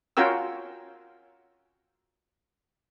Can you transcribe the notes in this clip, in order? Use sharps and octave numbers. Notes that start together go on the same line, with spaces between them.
C#4 F4 F#4 A#4 G5 E6